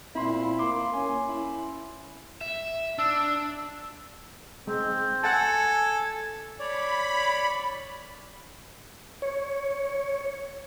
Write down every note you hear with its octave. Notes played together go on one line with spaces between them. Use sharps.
A#2 C4 E4 C6
A#3 C6 D6
C#4 G#5
E4
E5
D4 E6
G#3 C4
A4 F#5 G#5 A5
C#5 D5 B5
C#5